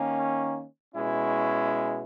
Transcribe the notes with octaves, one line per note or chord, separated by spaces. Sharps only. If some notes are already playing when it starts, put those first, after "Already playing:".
Already playing: D#3 A#3 C#4
B2 G#3 C#4 E4